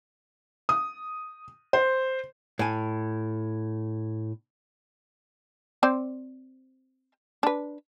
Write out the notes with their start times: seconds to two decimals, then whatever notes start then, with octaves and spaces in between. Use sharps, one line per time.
0.69 D#6
1.73 C5
2.59 A2 G#5
5.83 C4 C5 D5
7.43 D4 B4